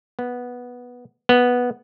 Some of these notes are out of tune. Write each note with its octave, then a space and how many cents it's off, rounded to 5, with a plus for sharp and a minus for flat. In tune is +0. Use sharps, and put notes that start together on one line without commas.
B3 -5
B3 -5